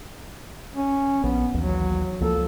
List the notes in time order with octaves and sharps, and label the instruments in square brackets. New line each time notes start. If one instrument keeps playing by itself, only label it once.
[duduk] C#4
[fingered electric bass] A#1 [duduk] B3
[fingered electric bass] A#1 D#2 E3 [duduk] F#3
[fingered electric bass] C#2 F3 A#3 [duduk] A4